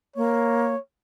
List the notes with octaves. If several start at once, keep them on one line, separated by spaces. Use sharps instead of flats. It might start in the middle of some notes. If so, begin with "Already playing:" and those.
A#3 C#5